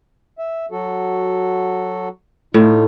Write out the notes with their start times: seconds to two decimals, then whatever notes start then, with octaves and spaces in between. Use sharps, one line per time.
0.39 E5
0.71 F#3 F#4 A4
2.54 A2 D#4 F4